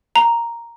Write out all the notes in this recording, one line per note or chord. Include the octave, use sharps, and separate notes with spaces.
A#5